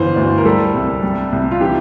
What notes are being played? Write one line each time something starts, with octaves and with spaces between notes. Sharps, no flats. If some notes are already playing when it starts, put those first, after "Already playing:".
Already playing: G1 E3 C5
D2
A#4
G3 A4
C2
G3
C2
F4
E3 G4